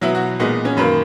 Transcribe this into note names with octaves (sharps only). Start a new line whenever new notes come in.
B2 F#3 B3 E4
F#4
A#2 G#3 B3 D#4
C#4
F#2 D#3 A#3 B4